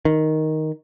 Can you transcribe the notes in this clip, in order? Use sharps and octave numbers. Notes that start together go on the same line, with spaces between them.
D#3